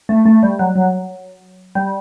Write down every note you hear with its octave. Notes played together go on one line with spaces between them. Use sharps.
A3
A3
G3
F#3
F#3
G3